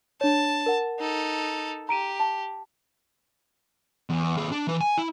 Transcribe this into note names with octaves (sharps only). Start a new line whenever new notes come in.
D4 C#5 A5
A#4 F#5
D#4 A4
G4 A#5 D7 D#7
A5
E2
D#2 G#4
D4
E3 B4
G#5
E4